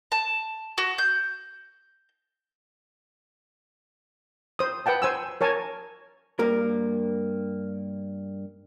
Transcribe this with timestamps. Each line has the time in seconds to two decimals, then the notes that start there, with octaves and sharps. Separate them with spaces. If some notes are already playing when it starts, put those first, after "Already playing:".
0.12 A5
0.78 F#4
0.98 G6
4.59 C5 D#6
4.86 B4 F#5 G5 A5
5.02 C5 G#5 E6
5.41 A#4 C#5 G#5 A5
6.39 G2 A#3 A#4